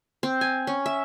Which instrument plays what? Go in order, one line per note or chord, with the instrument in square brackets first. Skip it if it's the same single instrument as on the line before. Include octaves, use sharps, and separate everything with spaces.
[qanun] C4
G#5
C#4
E5